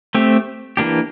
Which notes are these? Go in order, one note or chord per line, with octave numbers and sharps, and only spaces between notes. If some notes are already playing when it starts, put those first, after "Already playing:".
A3 C4 G4
E3 A#3 D4 G4